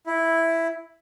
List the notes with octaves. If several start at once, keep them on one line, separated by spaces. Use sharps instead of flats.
E4